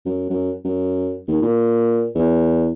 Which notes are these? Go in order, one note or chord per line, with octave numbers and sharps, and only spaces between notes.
F#2
F#2
F#2
D#2
A#2
E2